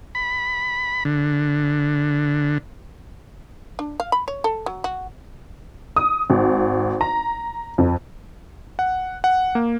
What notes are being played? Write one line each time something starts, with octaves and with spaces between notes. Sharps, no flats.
B5
D3
D4
F5
B5
C#5
A4
F#3
F#4
D#6
G#1
A#5
F2
F#5
F#5
A#3